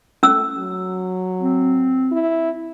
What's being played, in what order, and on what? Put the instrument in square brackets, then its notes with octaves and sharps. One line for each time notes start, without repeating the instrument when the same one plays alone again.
[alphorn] A3 [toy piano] C#4 E6
[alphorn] F#3
[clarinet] C4
[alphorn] E4